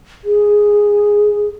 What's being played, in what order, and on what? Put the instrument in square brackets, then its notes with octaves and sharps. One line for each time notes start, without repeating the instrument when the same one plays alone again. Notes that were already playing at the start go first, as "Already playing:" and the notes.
[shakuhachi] G#4